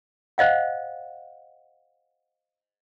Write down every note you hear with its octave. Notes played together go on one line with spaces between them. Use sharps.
C5 D#5 F5 F#5